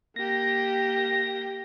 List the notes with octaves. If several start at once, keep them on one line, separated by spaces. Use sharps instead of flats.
A#3 G4 A#6